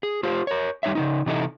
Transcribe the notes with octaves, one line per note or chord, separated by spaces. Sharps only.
G#4
F4 G4 C5
A#4 C#5
G3 D#4 C#5 E5
C#3 G3 D#4
C3 E3 D#4 E4 A4 D#5